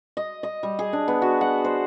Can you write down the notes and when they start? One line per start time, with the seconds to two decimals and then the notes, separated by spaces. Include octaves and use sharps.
0.17 D#5
0.43 D#5
0.63 G3
0.79 G#4
0.93 D4
1.08 B3
1.22 F#4
1.41 F#5
1.65 C5